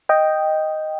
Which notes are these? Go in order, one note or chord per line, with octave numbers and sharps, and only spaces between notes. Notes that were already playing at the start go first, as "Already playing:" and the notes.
D#5 G5